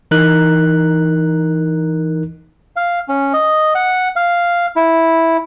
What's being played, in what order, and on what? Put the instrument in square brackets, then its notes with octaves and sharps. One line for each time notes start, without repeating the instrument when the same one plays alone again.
[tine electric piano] E3 D#4 A#4 F#6
[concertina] F5
C#4
D#5
F#5
F5
E4